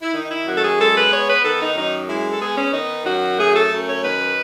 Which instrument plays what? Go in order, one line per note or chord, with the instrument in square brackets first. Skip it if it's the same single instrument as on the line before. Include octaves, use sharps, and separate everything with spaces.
[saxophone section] E4
D#3 D#4
E4
F#2 F#4
A4
G#4
G#3 A4
B4
B3 C#5
B4
D#3 A4
D#4
F#2 D#4
G#3 E4
A4
B3 G#4
C#4
D#3 D#4
F#2 F#4
A3 G#4
A4
F#2
C#5
D#3 B4